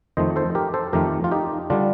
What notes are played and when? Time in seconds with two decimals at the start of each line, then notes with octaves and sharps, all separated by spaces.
0.17 F2 D#3 A3 C5 D#5
0.36 A4 C5
0.55 G4 A#4
0.74 A4 C5
0.93 F2 D#3 A3 G4 A#4
1.24 F4
1.31 D#4 G4
1.70 D3 G3 D4 F4